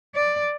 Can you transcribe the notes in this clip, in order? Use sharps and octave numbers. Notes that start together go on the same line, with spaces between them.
D5